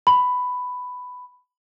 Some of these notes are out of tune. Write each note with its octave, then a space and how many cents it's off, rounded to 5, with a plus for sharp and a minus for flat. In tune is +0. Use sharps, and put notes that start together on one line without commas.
B5 +10